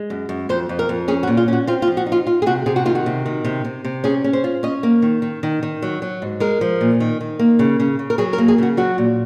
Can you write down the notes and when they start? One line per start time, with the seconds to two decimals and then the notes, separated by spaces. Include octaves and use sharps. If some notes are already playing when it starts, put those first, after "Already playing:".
Already playing: G#3
0.10 F#2
0.29 F#2
0.49 F2 C5
0.69 F2
0.79 A#4
0.89 F2
1.08 C#4 G#4
1.23 F#4
1.27 A#2
1.37 F4
1.48 C#4 F#4
1.67 C4 F4
1.82 F4
1.87 F3
1.97 F#4
2.06 D#4
2.12 F4
2.27 F4
2.42 G#4
2.46 C3 F#4
2.66 C3 G#4
2.76 F#4
2.85 D#3 F4
2.95 F#4
3.06 C3
3.26 D#3
3.44 C3
3.64 C3
3.85 C3
4.04 C#4 G#4
4.24 C#4
4.33 C5
4.44 F4
4.63 C#4 D#5
4.83 A#3
5.02 D#3
5.22 D#3
5.43 D#3
5.63 D#3
5.82 F#3
6.02 F#3
6.22 G#2
6.40 G#3 A#4
6.61 F3
6.81 A#2
7.00 D#3
7.21 D#3
7.39 A#3
7.59 C#3
7.80 C#3
7.99 C#3
8.10 A#4
8.18 F#3 G#4
8.33 A#4
8.38 A#3
8.48 G#4
8.58 C#3 F#4
8.77 F#3 F#4
8.98 A#2